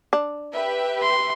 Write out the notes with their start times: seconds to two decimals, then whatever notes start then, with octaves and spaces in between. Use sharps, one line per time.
0.13 D4
0.54 G4 B4 E5
1.02 C6